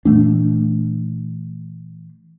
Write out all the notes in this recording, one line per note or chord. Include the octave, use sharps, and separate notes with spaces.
A#2 E3 A3 D4